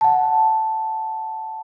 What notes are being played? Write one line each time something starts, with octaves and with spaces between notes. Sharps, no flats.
F#5 A5